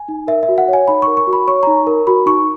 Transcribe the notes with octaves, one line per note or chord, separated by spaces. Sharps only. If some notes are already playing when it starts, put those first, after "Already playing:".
Already playing: G#5
D#4
A#4 E5
E5
F#4
F#5
C#5
G#5
D#4 B5
A#4 C#6
C#6
F#4
B5
C#5 C#6
D#4 A#5
A#4
F#4 B5
D#4 C#6